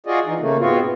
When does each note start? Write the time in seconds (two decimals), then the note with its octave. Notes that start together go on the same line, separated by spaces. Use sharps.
0.06 F4 F#4 G#4 D5 D#5
0.26 E3 D#4
0.40 C#3 A3 A#3
0.59 G#2 B2 B3 C4 F4 F#4